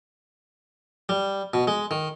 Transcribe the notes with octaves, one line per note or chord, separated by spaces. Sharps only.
G3
B2
G#3
D#3